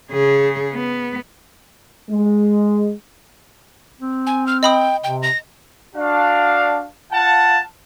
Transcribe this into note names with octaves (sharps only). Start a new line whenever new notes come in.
C#3 G#4
B3
G#3
C4
G#5
F6
D#5 G5 B5 D#6
C3 G5
A#6
D4 F#4 F5
F4 F5 F#5 A5